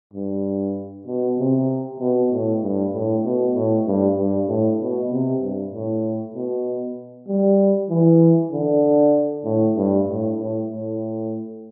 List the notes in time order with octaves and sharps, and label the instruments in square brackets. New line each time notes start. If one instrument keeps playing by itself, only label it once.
[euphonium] G2
B2
C3
B2
A2
G2
A2
B2
A2
G2
G2
A2
B2
C3
G2
A2
B2
G3
E3
D3
A2
G2
A2
A2
A2